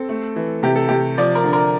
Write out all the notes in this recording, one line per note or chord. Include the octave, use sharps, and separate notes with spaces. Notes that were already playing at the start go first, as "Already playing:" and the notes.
Already playing: C4 A4
A3
E3
C3 G4
A4
C3 G4
F3 D5
A#4
D3
A#4